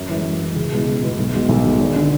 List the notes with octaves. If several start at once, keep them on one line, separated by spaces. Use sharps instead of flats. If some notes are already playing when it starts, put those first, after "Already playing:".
Already playing: F#2
E3
G#3
F#2
E3 G#3
C#2
B2 G#3 B3 E4
C#2
B2 G#3 B3 E4
B1
B2 G#3
B1
B2 G#3
G#1
D3